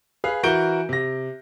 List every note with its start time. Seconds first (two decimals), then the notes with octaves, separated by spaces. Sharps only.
0.24 G#4 B4 F5
0.43 E3 F#4 A#4 G6 D7 G7
0.89 C3 A#6